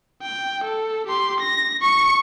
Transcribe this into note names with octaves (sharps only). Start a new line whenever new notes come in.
G5
A4
G4 C6
A#6
C#6 C#7